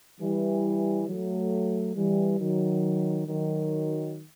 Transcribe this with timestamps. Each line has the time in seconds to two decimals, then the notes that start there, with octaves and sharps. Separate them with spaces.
0.21 E3 G3
1.08 F#3 A3
1.96 E3 G3
2.39 D#3 F#3
3.27 D#3 F#3